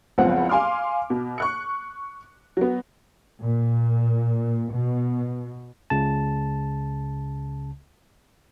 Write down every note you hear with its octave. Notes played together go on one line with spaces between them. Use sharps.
F#1 C#2 F3 B3 C4 F#5
F5 G#5 C6 D6 F6
B2
C#6 F#6 C#7
F#3 B3
A#2
B2
C#2 C#3 A5